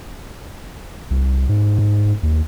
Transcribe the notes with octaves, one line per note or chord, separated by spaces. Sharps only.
C2
G#2
G#2
D#2